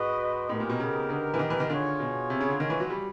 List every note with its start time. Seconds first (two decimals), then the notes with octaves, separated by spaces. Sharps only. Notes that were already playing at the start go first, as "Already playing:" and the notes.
Already playing: G#2 F#4 B4 D#5
0.49 A2 B3 D#4 G4 A#4
0.60 A#2
0.69 B2
0.80 C#3
1.10 D3
1.34 E3
1.39 D#3
1.50 E3
1.60 D#3
1.70 D3 F4 G#4 C#5
2.00 B2
2.30 C3
2.40 C#3
2.50 D3
2.60 D#3
2.70 E3
2.80 F#3
2.90 G3